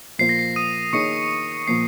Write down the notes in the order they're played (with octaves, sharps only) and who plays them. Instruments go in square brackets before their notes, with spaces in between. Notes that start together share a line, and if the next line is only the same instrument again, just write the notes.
[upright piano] A#2 F3 A#3 F4 C5 [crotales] C7
[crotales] A#6
C7
D#6 D#7
[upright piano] D#3 A#3 D#4 G#4 C#5 [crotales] C#6 C#7
[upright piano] A#2 F3 A#3 [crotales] C7